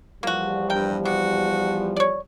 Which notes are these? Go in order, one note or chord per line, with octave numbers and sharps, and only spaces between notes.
E2 F3 G3 A#3 F#4
G2 A#4 G5
C3 F#4
C#5 D5